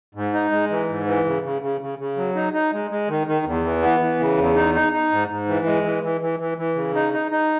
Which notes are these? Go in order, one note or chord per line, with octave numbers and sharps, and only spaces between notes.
G#2
D#4
G#3
E3
G#2
E3
C#3
C#3
C#3
C#3
C#3
F#3
D#4
D#4
G#3
G#3
D#3
D#3
E2
E3
B3
E3
C#3
E2
D#4
D#4
D#4
G#2
G#2
E3
G#3
E3
E3
E3
E3
E3
C#3
D#4
D#4
D#4